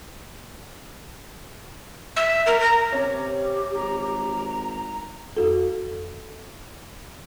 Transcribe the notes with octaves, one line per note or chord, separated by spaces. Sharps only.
E5
A#4
A#5
C3 C#4 G4
G#1 A#5
F2 F#4 A4